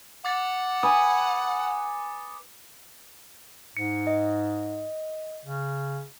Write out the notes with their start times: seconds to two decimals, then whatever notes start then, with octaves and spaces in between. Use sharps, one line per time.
0.25 F#5 D6 A6 C#7
0.83 B4 G#5 D#6
3.77 G#2 C#7
4.07 D#5
5.46 C#3